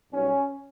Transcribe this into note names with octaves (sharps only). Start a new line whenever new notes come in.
B1 B2 G3 C#4